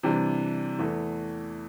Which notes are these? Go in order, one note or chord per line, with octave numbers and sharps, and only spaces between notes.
C3 E3 G3 D4
E2 E3 A3